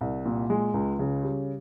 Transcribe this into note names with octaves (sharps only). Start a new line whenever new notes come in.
C2
A#2
G#3
C#2
C#3
G3